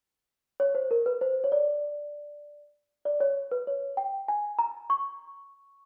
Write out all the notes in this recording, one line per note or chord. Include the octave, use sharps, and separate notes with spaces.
C#5
C5
A#4
B4
C5
C#5
D5
D5
C#5
B4
C#5
G5
G#5
A#5
C#6